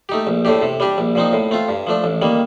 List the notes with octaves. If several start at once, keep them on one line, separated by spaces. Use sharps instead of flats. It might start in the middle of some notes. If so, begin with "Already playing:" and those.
A3 D#4 G4
A#1
A2 A3 D4 G4
C3
G3 D4 G4
A#1
A#2 F3 C4 D#4
A2
A3 C4 F4
G2
F3 A3 D4
A1
D#3 G3 A#3